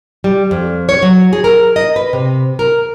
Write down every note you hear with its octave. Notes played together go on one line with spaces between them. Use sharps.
G3
F2
C#5
F#3
G#4
A#4
D#5
B4
C3
A#4